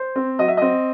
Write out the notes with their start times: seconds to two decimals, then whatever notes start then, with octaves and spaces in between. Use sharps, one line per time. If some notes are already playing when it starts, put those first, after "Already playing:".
Already playing: C5
0.16 C4
0.39 F#3 D#5
0.48 E5
0.57 C4 D#5